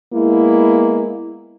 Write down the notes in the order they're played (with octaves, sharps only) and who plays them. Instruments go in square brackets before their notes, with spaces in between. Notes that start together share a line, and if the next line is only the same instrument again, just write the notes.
[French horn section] G#3 A#3 B3 E4